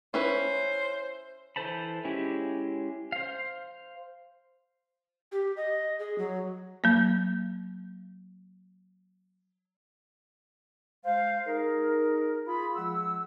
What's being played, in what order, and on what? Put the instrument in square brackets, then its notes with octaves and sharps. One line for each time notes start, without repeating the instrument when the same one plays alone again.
[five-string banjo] C#4 E4 B4 [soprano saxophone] C5
[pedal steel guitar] E3 A4 C5 A5 B5
G#3 C#4 E4 G4 G#4
C5 F5
[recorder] G4
D#5
G#4
F#3
[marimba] F#3 A#3
[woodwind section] G#3 C5 F5
D#4 G#4 A#4
F4 G#4 B5
F3 G#3 G#4 F#5 E6